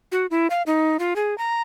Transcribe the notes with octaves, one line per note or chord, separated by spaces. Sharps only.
F#4
E4
F5
D#4
F4
G#4
A#5